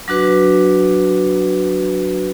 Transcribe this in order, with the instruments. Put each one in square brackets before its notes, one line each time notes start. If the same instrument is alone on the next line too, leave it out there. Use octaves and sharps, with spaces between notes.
[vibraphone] F#3 D4 F#4 B4